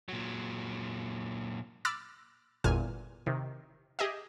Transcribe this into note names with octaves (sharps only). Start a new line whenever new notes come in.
A#2 F#3
B5 D6 E6 F6 A6
G1 E2 A#2 G#5 F6
C3 D#3
G4 G#4 D#5 E5